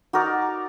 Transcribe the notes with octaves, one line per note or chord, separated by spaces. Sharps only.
D#4 F#4 A#4 D5